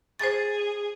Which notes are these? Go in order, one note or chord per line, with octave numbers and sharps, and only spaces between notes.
G#4 C5 A6